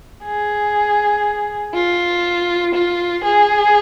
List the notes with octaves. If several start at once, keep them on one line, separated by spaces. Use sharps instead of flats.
G#4
F4
F4
G#4